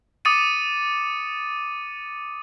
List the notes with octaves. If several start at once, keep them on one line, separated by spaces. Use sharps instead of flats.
D6 D#6 A6 C#7 D#7